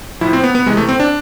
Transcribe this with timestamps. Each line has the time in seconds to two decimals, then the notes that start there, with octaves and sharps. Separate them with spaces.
0.21 A2 F3 E4
0.33 C4
0.44 B3
0.55 B3
0.66 C3 E3 G#3
0.77 A3
0.89 C4
1.00 D4